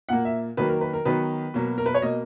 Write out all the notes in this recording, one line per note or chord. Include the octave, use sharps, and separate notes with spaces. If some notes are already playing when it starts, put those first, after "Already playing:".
A#2 A#3 F#5
E5
D#3 F#3 A#3 B4
A#4
B4
A#4
D#3 F#3 B3 B4
B2 F#3 A#3
A#4
B4
C#5
B2 A#3 D#5